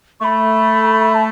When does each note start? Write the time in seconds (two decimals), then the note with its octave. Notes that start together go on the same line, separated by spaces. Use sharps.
0.20 A3 C#6
0.24 B5
1.15 A5